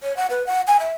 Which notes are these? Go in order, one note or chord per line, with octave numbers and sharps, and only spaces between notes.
C#5
F#5
B4
F#5
G#5
E5